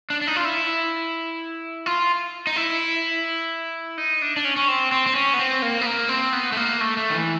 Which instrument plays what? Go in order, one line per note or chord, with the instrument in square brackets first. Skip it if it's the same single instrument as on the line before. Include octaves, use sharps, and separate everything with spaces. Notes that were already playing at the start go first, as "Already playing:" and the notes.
[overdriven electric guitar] D4
D4
D#4
F4
E4
F4
D#4
E4
D#4
D4
D4
C#4
C#4
C4
C4
C4
C#4
B3
C4
A#3
B3
A#3
C4
B3
A3
A#3
A3
A3
D#3
E3